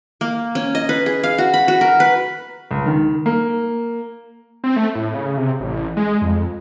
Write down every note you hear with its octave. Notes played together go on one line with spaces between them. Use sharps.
A#3
C#4
D#5
B4
G#4
F5
F#4
B5
F#4
A#4
B4
C#2
D#3
A#3
C4
A3
A2
C#3
C3
A1
G#3
F2